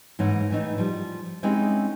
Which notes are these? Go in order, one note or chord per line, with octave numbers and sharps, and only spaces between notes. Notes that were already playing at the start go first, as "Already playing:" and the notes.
G#2 E3 A#3 D#4 C#5 F#5
A2 E3 A3 D#4
F3 G3
G#3 C4 C#4 D#4 E4 G4